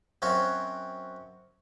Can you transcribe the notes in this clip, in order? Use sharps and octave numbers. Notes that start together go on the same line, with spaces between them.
F#2 C4 F#4 C#5 F5